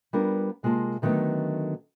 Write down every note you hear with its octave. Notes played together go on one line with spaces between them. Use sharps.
G3 B3 D4 F4 A#4
C3 G#3 A#3 F4 A5
D3 D#3 F#3 A3 B3 D#4